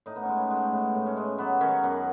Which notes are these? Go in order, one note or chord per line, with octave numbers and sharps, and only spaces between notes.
A2 D#4
B3
C#4
G#3
B3
G#3
A3
A2 B3
A2
C#4
G#3
F#3 B3
D#3 C#4
F#2 B3